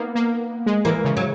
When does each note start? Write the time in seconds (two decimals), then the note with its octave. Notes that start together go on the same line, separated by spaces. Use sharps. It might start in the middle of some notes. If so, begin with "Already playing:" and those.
Already playing: A#3 B3 D#4
0.15 A#3
0.66 G#3
0.85 E3 A#3
1.04 C#3
1.17 F#3